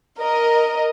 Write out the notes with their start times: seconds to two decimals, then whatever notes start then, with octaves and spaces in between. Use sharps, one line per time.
0.19 A#4 D#5